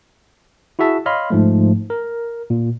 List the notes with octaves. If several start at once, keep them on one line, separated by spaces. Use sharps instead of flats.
E4 F#4 G#4 E5 A5
C#5 D#5 F5 B5 C6 F6
G#2 F3 A3
A#4
A#2